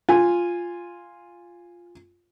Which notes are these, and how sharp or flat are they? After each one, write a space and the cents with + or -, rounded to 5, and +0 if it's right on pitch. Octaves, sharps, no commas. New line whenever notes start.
F4 +0 G#5 -10